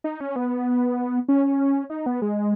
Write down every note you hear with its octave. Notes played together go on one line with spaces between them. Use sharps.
D#4
C#4
B3
C#4
D#4
B3
G#3